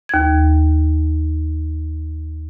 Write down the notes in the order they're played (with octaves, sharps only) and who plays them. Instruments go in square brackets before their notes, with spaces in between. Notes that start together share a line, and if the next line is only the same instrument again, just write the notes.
[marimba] D#2 G#6